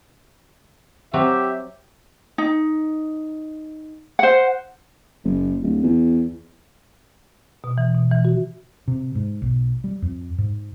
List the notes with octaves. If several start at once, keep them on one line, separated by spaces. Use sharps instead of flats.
F#3 C4 G4 E5
D#4
C5 F#5
F#1
D1
E2
B2
E3
B2
E3
F#4
C3
G#2
B1
G3
F2
G#2